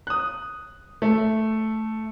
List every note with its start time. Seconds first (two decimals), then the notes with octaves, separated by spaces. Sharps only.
0.07 D#6 F#6
1.02 A3